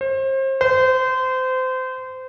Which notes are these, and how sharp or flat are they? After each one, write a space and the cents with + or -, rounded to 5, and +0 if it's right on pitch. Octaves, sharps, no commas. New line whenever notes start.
C5 +35
C5 -25